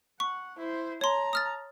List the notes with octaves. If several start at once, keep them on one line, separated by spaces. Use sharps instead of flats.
F#5 C#6
E4 C5
C#5 A5 A#5 C6
D#6 F6 A6